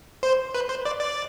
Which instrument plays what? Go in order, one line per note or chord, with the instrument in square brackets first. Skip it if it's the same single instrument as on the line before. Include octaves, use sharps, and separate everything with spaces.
[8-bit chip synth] C5
B4
C5
D5
D5